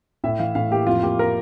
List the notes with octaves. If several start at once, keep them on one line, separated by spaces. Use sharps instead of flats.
A2 E5
E3 F5
A2 F5
A#3 G4
F2 F4
A#3 G4
A#4